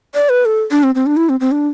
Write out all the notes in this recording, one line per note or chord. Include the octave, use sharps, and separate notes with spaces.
D5
B4
A4
D4
C4
C4
D4
E4
C4
C4
D4